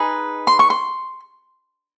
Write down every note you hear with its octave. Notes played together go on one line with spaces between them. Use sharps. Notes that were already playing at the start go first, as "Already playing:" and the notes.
Already playing: D#4 G#4 B4
C6
C#6
C6